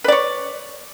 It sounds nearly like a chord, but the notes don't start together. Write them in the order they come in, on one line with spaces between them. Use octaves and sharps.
B4 D5 C#5